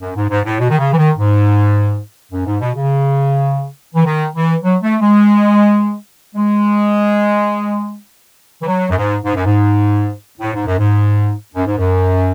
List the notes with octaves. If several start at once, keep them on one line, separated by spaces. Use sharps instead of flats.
F#2
G#2
G#2
A2
B2
D#3
C#3
E3
D#3
G#2
F#2
G#2
B2
C#3
E3
D#3
E3
F#3
A3
G#3
G#3
E3
F#3
F#2
G#2
G#2
F#2
G#2
A2
G#2
F#2
G#2
F#2
G#2
F#2